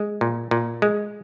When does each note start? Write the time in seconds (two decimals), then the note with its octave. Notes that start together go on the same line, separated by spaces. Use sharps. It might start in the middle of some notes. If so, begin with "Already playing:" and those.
Already playing: G#3
0.21 A#2
0.51 A#2
0.82 G#3